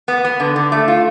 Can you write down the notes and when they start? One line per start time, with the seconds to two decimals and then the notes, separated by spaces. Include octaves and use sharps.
0.08 B3
0.25 B3
0.40 D3
0.56 D3
0.72 A3
0.88 F4